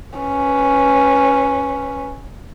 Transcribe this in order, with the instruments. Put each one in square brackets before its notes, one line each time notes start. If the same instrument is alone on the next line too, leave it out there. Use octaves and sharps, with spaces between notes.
[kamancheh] C#4 B4